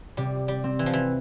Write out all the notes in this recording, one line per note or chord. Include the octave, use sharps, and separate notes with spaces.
C3 G3
G3
C4
E3
F3
E3